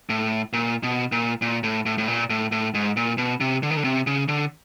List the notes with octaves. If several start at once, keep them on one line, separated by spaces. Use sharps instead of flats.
A2
A#2
B2
A#2
A#2
A2
A2
A2
A#2
A2
A2
G#2
A#2
B2
C3
D3
D#3
D3
C3
C#3
D3